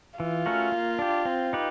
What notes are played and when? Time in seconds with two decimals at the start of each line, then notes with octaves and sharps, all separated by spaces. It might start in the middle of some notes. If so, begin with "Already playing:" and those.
0.19 E3 F4
0.46 A3 C#4 F#4 A#4
0.72 A#3
0.99 D4 G4
1.25 C4
1.53 D#4 G4 B4